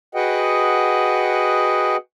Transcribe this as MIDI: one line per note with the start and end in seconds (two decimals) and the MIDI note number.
0.15 1.96 66
0.15 1.96 68
0.15 1.96 71
0.15 1.96 75
0.15 1.96 78
0.15 1.96 79